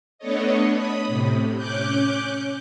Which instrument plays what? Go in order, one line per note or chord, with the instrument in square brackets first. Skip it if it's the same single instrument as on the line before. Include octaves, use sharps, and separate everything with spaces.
[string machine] A3 B3 D4 A4 C#5 D#5
B5 D#6
A2 C3
C#4 D6 F#6 G6